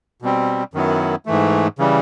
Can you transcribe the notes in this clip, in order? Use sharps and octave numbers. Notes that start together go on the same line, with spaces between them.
B2 G3 C4
F#2 D#3 F#3 B3 E4
G#2 E3 A3
C#3 E3 G3